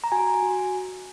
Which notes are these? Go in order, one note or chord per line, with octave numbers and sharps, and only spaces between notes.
A#5
F#4 G#5
G#5
F#4